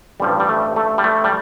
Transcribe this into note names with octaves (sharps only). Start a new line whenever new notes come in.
A1 G2 F3 G3
G3
A3
A3
G3
A3
G3